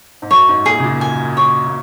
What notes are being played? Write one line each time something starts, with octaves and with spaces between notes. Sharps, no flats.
G#2
F#2 C#5
G#2
A#2 G#4
C#3
A#2
G#5
C#5
A#2